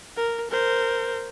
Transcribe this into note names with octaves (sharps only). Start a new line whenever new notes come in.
A#4
A#4 C5